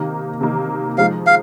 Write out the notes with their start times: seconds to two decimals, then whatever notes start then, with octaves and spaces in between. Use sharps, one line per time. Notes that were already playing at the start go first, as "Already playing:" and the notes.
Already playing: C3 D#3 A#3 D#4
0.41 C3 D#3 A#3 D#4
0.98 F3 G#3 D#4 F5
1.27 F5